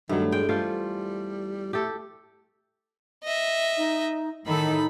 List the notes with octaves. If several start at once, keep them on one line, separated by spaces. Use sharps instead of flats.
G2 D#3 F#3 A3
E2 G#3 G5
G3 A3 F4 C5
A3 G4 A4
D#5 E5
D#4
A2 D#3 D#4 A4 B5